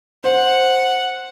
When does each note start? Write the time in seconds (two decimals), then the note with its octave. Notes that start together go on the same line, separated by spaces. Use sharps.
0.24 C5 F#5